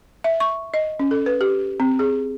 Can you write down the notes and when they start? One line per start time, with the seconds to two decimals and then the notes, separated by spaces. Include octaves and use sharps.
0.24 E5
0.40 C#6
0.74 D#5
1.00 C#4
1.11 A4
1.26 B4
1.41 G4
1.80 C4
1.99 G#4